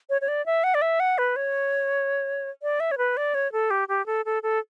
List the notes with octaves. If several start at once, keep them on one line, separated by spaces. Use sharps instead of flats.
C#5
C#5
D5
E5
F#5
D5
E5
F#5
B4
C#5
D5
E5
C#5
B4
D5
C#5
A4
G4
G4
A4
A4
A4